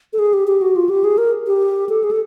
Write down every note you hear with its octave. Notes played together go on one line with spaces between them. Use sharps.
A4
G#4
G4
G4
F#4
F4
G4
G#4
A#4
G4
A4
G#4
A4